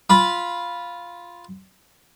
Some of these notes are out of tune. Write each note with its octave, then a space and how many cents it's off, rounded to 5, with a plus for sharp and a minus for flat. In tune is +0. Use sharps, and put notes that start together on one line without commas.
F4 +0 B5 -10